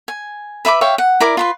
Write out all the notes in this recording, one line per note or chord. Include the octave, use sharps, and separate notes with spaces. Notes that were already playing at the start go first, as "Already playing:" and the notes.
G#5
B4 E5 B5 D6
C#5 E5 F5 G5
F#5
E4 A#4 D5 D6
F4 B4 C6